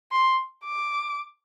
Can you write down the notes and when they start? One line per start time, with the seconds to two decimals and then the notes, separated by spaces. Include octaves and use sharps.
0.12 C6
0.65 D6